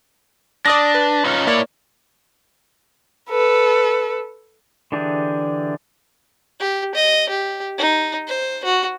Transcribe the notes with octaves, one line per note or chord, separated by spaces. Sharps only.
D4 D5 D#6 A#6
B4
C#4 D#4 F4
A#3 E4 C#5 D5
A4 B4
D3 E3 D4 G4 G#4
G4
D#5
G4
D#4
C5
F#4